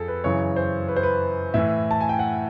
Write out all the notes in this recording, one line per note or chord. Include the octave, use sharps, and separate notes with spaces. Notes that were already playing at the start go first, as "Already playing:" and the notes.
Already playing: F2 G#4 A4
B4
F#2 C#3 E3 C#5
C5
B4
C5
B4
A2 E3 E5
A5
G#5
G5
F#5